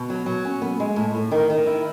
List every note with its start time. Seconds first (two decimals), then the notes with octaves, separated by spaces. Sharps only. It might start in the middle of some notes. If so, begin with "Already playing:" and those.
Already playing: B2
0.10 F#3
0.26 F#3
0.45 C#4
0.62 B3
0.80 G#3
0.96 A2
1.15 A2
1.31 D#3
1.50 D#3
1.66 E4